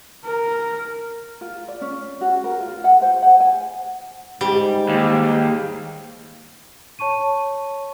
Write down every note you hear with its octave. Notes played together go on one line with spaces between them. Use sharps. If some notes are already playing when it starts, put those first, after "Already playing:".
A#4
F4
D5
C#4
F#4
A#4
F4
F#5
C5
F#5
G#5
G#2 G3
D#2
C#5 A5 C#6 D#7